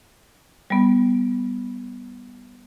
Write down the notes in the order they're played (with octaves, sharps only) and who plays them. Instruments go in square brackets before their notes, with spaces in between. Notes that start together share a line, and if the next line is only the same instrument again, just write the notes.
[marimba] G3 B3